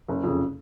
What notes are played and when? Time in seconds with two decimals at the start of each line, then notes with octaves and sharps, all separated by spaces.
0.08 F#1
0.23 F2 C#3